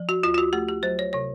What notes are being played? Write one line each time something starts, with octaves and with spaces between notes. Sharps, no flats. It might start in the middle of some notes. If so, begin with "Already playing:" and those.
Already playing: F3
F#4
D2 F4
F4
F#4
A3 G4
G4
F#3 C5
C#5
C3 C#5